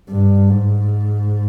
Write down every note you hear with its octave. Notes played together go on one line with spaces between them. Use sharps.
G2
G#2